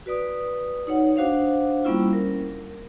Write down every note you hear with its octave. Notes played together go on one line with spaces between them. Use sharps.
F#4 B4 D5 D#6
D#4 C#5 F#5
D4 F#4 C5 F5 F#5
G3 A#3 B3 C#4 E4 F4
A#4